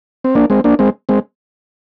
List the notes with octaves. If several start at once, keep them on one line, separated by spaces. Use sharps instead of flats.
C4
A#3 D4
G#3 C4
A#3 D4
G#3 C4
G#3 C4